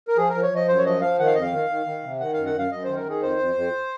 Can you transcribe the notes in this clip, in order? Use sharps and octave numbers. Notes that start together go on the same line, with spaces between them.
A#4
F3 G#4
A#4
F3
C#5
F3 D#5
F#2 C5
C#5
F3 D#5
F3 F5
D#3 F#5
F5
F2 D#5
F5
D#3
D#3
D#3
C3
D#3 F#5
F#2 F5
F#5
F#2 F5
F#2 D#5
D#3 C5
A#4
D#3
G#4
F2 C5
F2
F2